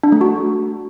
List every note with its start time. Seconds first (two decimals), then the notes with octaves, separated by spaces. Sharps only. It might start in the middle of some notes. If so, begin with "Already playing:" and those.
0.03 D4
0.12 A3
0.21 F#4